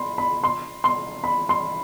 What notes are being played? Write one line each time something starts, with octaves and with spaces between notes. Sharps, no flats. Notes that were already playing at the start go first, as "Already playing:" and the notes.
Already playing: B5 C6
B5
C6
C6
B5
C6